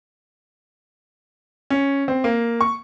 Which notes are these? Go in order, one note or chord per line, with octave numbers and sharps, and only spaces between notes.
C#4
C4
A#3
C#6